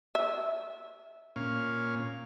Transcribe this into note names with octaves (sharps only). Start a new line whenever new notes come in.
E5
A#2 C#4 F5